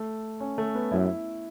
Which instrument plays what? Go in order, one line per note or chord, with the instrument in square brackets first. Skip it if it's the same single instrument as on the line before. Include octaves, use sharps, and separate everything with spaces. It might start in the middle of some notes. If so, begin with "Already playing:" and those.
Already playing: [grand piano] A3
C#4
A3
B3
[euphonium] F#2 [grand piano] E4